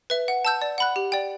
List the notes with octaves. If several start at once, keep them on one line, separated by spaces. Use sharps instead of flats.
B4 E5
F#5
A5 E6 G6
D5
F#5 B5 F#6
G4
D5 G5